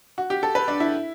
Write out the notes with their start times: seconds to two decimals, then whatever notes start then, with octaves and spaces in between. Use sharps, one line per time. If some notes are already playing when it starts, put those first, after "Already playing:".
0.18 F#4
0.30 G4
0.43 A4
0.55 B4
0.68 D4
0.80 E4